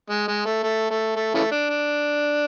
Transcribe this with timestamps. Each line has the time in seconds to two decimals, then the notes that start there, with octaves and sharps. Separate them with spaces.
0.10 G#3
0.28 G#3
0.46 A3
0.63 A3
0.91 A3
1.16 A3
1.35 C#3 E3 A3
1.52 D4
1.70 D4